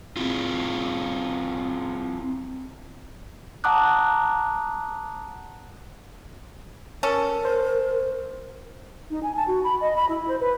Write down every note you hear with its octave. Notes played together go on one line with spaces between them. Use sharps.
C4 E4 F4
F#5 A5 A#5 D6 D#6 F#6
C#4 A4 A#4
C5
D#4
G#5
A5
F#4
B5
D#5
B5
E4
C5
B4